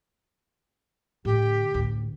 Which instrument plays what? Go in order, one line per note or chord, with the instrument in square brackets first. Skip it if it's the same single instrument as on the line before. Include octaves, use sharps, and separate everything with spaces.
[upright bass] A2 D3 [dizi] G4
[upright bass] A1 D2